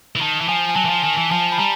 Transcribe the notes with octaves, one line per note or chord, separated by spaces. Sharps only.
E3
D#3 A5
E3
F3 G#5
G#5
F#3 A5
E3
F3
D#3 G#5
E3
F3 A5
B5
G3 A#5